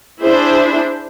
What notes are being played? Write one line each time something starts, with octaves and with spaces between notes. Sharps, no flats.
D4 E4 G#4 C5